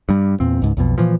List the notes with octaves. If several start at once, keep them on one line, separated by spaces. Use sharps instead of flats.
G2 G3
E2 A#2 C4
C#2 G#2
B1 F2 B2
A#2 E3 F3